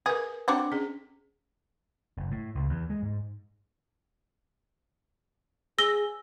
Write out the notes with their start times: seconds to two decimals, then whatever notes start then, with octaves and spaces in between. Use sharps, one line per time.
0.06 G#4 A#4 B4
0.48 C4 D4 F#4
0.72 C#4 G#4
2.18 F#1
2.32 A2
2.56 C#2
2.70 E2
2.90 G#3
3.03 G#2
5.79 G#4 E6 A#6 G7